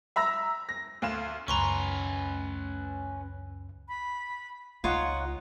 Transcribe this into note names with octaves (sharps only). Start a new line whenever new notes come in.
E5 A#5 E6 A#6
A#6
D2 F5 E7
C#2 F#2 C#4 B4 A#5 C6 C#6
B5
C#2 D#4 F4 C#5 F#5